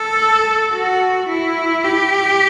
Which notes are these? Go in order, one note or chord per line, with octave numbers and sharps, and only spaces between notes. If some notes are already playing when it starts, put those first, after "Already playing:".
Already playing: A4
F#4
E4
G4